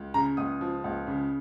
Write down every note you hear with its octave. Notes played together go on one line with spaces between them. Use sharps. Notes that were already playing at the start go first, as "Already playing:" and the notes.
Already playing: C#2
C#3 A#5
C#2 D#6
F3
C#2
C#3